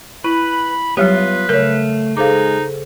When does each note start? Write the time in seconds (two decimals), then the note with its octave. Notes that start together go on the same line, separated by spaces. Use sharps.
0.24 E4 B4 B5
0.97 F#3 G3 B3 F4 G4 B4 C#5 E5
1.49 C#3 A3 A#4 C#5 F5
2.17 G#3 D#4 G#4 A4 C5 F5 D6